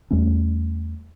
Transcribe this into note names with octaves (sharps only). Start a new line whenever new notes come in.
E2 G3 A3 C#4